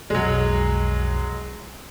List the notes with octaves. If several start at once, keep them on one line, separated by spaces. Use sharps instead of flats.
B1 F2 F#3 G#3